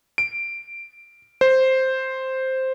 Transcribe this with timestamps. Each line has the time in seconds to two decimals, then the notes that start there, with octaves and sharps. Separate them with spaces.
0.18 D7
1.41 C5